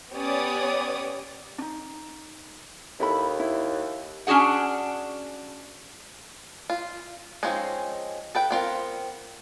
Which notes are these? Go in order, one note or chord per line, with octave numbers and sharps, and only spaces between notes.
B3 C#4 G4 C#5 D5 D#6
D4 D#4
D#2 E4 A4 B5
E4
C#4 D4 F#4 G#4 F#5
F4
F3 G#3 C4 C#4 D#4
A4 B4 G5
B3 C4 F4 A#4